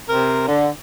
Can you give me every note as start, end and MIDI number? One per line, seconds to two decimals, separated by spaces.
0.09 0.44 48
0.09 0.44 60
0.09 0.44 70
0.48 0.69 50